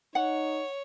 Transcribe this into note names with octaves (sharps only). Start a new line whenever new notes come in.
D#4 C#5 F#5